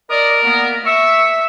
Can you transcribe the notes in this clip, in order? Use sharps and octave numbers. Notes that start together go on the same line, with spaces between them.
A#4 D5 D#5 D#6
A#3 B3
E5 C#6 E6